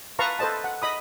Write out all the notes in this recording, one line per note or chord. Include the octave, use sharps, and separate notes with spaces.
B4 F5 A5 A#5 C#6
A4 B4 C5 D#5 A5
F#5
D#5 B5 D#6